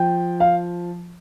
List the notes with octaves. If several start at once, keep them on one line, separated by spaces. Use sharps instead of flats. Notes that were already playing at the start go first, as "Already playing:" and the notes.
Already playing: F3 G5
F5